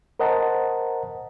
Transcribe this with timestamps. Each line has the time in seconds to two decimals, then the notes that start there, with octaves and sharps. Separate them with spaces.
0.20 A#4 C5 D#5 F#5 A5 A#5